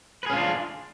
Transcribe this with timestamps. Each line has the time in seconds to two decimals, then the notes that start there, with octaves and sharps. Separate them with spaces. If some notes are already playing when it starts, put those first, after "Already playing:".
0.23 B4
0.26 G#4
0.30 C#4
0.33 F4
0.36 D4